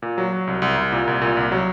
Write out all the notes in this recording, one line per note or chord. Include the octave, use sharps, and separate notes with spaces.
A#2
F#3
F#3
C2
C2
C2
A#2
C2
A#2
C2
F#3